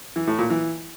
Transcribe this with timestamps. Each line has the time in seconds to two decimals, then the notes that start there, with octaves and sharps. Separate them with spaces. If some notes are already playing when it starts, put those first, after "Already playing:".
0.16 E3
0.27 A2
0.39 A#2
0.50 E3